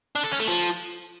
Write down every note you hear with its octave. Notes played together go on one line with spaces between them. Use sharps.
D4
A4
C#4
A3
F3